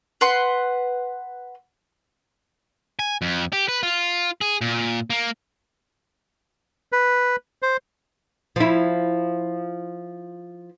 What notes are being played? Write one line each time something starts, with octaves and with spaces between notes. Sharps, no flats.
B4 F#5 C6
G#5
F2
G4
B4
F4
G#4
A#2
A#3
B4
C5
F3 E4